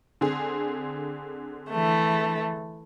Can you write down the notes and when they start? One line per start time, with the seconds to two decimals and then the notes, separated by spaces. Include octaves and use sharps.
0.21 D3 C4 G#4
1.71 E3 A3